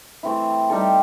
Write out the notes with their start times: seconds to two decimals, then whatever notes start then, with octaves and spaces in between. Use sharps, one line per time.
0.23 E3 A3 C4 E4
0.70 G3 D#4 A4